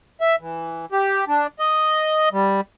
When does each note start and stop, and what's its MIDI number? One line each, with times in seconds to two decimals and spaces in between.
0.21 0.36 76
0.41 0.86 52
0.92 1.25 67
1.28 1.47 62
1.59 2.29 75
2.33 2.61 55